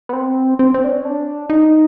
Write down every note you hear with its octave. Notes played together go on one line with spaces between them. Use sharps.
B3
C4
C4
C4
D4
C#4
D4
D#4